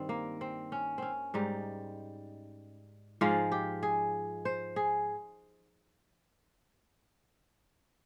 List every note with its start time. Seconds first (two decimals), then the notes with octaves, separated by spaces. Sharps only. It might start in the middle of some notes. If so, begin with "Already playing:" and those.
Already playing: G2 D#3 G3 C4
0.09 A#3
0.41 C4
0.72 C#4
0.98 C4 C#4
1.34 G#2 G3 D#4
3.21 G#2 F3 G#3 F4
3.52 G4
3.83 G#4
4.45 C5
4.76 G#4